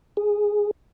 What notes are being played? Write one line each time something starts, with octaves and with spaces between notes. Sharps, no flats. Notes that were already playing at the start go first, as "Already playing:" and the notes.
G#4